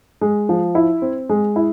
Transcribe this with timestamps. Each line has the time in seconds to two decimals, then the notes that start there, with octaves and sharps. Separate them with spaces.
0.21 G#3
0.49 F3
0.75 E4
1.02 C4
1.29 G#3
1.56 E4